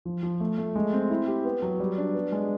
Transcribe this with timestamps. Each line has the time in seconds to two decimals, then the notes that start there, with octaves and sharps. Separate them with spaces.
0.05 F3
0.23 F3
0.40 A3
0.58 A3
0.76 G#3
0.93 C4
1.10 E4
1.27 G4
1.45 B3
1.62 F#3
1.80 G3
1.98 D4
2.14 B3
2.32 G#3